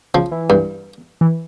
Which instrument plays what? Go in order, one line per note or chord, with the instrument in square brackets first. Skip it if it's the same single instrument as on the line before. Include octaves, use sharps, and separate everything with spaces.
[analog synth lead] C#3 [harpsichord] F3
[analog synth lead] E3
[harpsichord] G2
[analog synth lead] E3